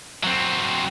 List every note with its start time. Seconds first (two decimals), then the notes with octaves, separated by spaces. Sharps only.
0.24 F#3 C4